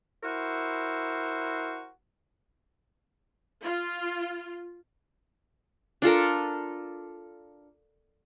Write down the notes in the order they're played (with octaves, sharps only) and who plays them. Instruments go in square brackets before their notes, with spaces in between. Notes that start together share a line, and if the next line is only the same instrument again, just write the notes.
[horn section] E4 F#4 A#4 C5
[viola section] F4
[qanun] D4 F4 A4 A#4